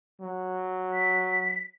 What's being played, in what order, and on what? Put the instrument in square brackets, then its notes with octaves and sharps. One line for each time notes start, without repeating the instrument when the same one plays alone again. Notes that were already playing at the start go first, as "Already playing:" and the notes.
[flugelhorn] F#3
[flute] B6